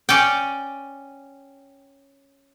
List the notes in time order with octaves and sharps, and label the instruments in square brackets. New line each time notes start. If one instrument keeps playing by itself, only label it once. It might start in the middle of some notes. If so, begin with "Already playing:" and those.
[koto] C#4 D5 G5